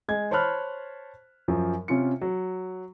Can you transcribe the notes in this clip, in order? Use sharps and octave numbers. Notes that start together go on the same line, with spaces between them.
G#3 G#6
C5 C#5 A5 B5 F6 F#6
F#2 F3
C3 C#4 F4 C#7
F#3